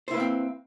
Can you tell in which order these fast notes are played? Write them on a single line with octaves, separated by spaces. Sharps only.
C5 E4 B4 A#3 C4